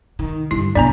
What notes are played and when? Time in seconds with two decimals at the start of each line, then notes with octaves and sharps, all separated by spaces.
0.19 D#3
0.51 G2 D3 E4
0.75 F2 C3 B3 D4 D5 A#5